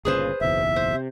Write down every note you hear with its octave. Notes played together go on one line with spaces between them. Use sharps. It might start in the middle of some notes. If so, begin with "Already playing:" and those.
G1 A#2 C#3 G#4 B4 C5
F#1 B1 E2 E5
C5
C3